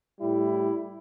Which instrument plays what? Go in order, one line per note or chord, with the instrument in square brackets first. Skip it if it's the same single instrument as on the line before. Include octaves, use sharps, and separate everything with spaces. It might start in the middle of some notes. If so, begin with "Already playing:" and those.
[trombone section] A2 G3 E4